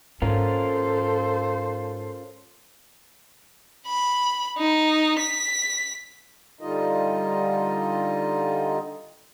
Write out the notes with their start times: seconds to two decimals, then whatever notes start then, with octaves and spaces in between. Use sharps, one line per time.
0.22 G#2 C#4 F4 A4 A#4 C5
3.87 B5
4.58 D#4
5.19 B6
6.61 D3 G3 D#4 F4 D#5